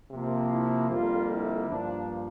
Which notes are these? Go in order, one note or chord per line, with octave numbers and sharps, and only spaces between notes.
C3 F3 A#3
E4
F2 D3 G3 A#3 F4
E4
G2 F3 A#3 D4